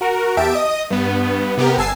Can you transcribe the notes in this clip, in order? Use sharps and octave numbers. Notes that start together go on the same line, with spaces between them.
F#4 A#4
E2 G4 E5 A5 D7
D#5 D#6
G2 B3
C3 B3 G4 A#4
G1 G#5 A5 E6 C7